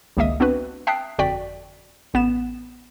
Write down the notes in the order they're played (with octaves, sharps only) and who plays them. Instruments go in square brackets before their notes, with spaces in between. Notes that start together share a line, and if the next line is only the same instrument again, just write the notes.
[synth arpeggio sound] G#1 C#2 A#3 D#5 E5 D#6
B3 C4 D4 F#4 B4
E5 G5 A5 D#6 F#6 C7
G1 F2 F#4 D5 G5 B6
A1 B3 E7